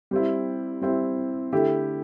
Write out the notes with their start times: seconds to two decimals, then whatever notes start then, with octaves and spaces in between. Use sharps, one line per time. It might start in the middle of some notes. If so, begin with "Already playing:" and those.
0.11 G3 C4 E4
0.81 G3 C4 E4
1.52 D3 A3 E4 G4